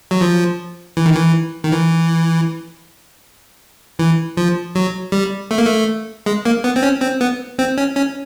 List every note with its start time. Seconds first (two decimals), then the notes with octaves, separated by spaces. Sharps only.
0.11 F#3
0.21 F3
0.97 E3
1.06 D#3
1.15 E3
1.64 D#3
1.72 E3
3.99 E3
4.37 F3
4.75 F#3
5.12 G3
5.51 A3
5.58 A#3
5.66 A3
6.26 G#3
6.45 A#3
6.64 B3
6.76 C4
6.83 C#4
7.02 C4
7.21 B3
7.59 C4
7.78 C#4
7.96 C#4